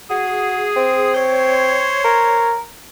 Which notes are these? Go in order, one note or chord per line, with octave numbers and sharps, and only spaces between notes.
F#4 G#4
C4
C5 C#5
A#4